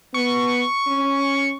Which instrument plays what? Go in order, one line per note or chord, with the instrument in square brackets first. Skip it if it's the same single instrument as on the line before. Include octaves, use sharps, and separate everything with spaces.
[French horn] B3 [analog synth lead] C#6
[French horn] C#4